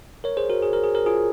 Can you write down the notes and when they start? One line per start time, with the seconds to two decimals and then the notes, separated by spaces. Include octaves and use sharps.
0.24 A#4 C#5
0.37 G#4 C5
0.50 F#4 A#4
0.62 G#4
0.73 A#4
0.84 G#4
0.95 A#4
1.06 F4 G#4